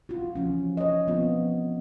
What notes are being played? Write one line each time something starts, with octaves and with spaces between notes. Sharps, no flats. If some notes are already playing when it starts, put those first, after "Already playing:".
F4 F#4
E3 F3 C#4
C#5 D#5
F3 B3 C4 F4